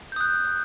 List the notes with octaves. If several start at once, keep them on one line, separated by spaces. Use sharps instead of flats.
D#6 F#6 G6